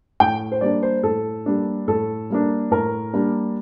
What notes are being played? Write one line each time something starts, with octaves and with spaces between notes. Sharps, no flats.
A2 G5
C5
G3 A#3 D4 D5
C5
A2 A4
G3 A#3 D4
A2 A4
G3 A#3 D4
A2 A#4
G3 A#3 D4